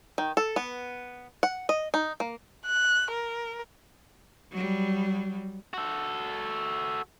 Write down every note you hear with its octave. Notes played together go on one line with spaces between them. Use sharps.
D#3
A4
B3
F#5
D#5
D#4
A#3
F#6
A#4
F#3 G3
F#4 A4